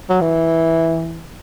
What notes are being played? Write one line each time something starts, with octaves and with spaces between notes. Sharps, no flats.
F#3
E3